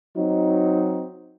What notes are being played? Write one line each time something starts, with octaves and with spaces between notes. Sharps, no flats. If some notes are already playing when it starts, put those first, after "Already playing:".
F#3 C4 D#4